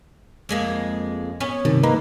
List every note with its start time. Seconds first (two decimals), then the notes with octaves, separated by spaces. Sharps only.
0.49 F2 G#3 A#3
1.40 B3 C#4
1.65 G2 C3 D#3
1.83 A#3 D#4 A#4 B4